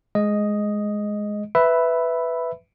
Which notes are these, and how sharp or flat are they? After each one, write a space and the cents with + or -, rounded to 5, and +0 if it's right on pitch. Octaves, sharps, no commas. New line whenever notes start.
G#3 +10 D#5 +0
B4 +10 E5 +0 B5 +0